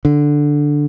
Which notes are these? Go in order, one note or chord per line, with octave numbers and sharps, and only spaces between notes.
D3